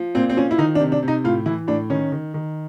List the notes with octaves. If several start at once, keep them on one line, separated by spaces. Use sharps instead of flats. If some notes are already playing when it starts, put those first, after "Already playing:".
Already playing: F3
A#2 C4
C4
F3 C#4
E4
D#3 D#4
D4
C3
D4
C3
D#4
A2 F4
E3 E4
A2 D4
D#3 C#4
D#3
D#3